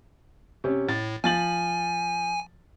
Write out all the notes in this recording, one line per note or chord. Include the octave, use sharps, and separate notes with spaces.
C3 C#4
A2 A6
F3 G#5 A6 F#7